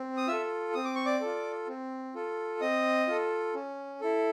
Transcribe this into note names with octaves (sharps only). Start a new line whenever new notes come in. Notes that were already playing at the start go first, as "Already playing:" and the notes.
Already playing: C4
D#6
F4 A4 E5 E6
C4 D#6
D6
C#6
D5 D6
F4 A4
C4
F4 A4
C4 D#5 D#6
F4 A4
C#4
E4 A4